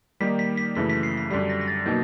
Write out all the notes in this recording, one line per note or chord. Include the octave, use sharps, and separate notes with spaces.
D#3 G3 A#3 D#4 B6
B6
B6
F#2 C#3 E3 A3 B6
B6
C7
B6
F#2 D3 G3 B6
A#6
A#6
A6
B2 F#3 A#3 D#4 G6